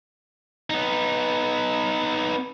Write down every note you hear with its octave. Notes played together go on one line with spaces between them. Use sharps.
B3 D#4